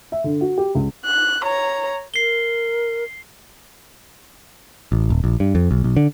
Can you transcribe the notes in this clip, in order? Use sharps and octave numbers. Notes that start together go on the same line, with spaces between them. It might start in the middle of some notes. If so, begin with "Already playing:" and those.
E5
D3
F#4
G4
C#2
F#6
C#5 A#5
A#4 C7 G7
A1
D#1
A#1
G2
F2
B1
B1
D3